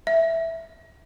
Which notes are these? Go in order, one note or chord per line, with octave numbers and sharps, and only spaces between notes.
E5